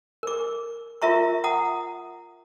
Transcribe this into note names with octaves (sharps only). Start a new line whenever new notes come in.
A#4 D6
F4 A#4 E5 A#5 C#6
F#5 A#5 D#6